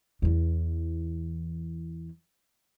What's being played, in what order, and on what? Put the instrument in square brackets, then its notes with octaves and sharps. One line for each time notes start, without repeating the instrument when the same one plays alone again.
[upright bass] E2 E3